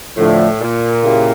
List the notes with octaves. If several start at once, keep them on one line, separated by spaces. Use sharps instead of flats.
A2 D3 F3 A3 D4
A#2
C#3 A#3 E4 G4